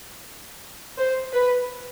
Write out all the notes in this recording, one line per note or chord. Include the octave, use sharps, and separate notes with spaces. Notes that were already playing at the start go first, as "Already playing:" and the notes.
C5
B4